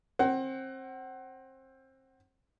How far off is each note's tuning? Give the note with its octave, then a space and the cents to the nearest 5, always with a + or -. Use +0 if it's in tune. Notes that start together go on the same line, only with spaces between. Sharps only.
C4 +25 F#5 +30